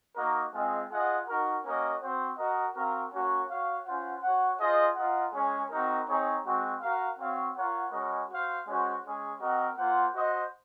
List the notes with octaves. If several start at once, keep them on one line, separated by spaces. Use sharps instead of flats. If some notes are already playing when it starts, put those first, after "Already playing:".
A#3 D#4 F#4 A#4 D#5
G#3 C4 F4 G#4 D#5
F4 G#4 D#5 F#5
D#4 F#4 A#4
A#3 C#4 F#4 A#4 D#5
C4 F#4 C5
F#4 A#4 D#5
C4 F#4 A#4 F5
A#3 C#4 F#4 C#5
F#4 C#5 F5
C#4 F4 C5 F#5
F#4 C#5 F#5
F4 G#4 C5 D#5
F4 A#4 D#5 F#5
G#3 C#4 G#4
C4 D#4 F#4 A#4
C4 D#4 G#4 C#5
G#3 C4 F#4
F#4 A#4 F5
C4 F#4 C#5 F5
F4 A#4 C#5 F#5
G#3 C#4 F#4 A#4 D#5
F#4 C5 F5
G#3 C#4 F#4 C5
G#3 C#4 G#4
C4 F#4 A#4 D#5 F#5
A#3 F4 C5 F#5
F#4 C5 D#5